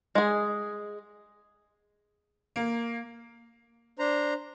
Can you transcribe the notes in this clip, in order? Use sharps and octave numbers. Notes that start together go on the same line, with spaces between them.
G#3 G#4
A#3
D4 C5 A#5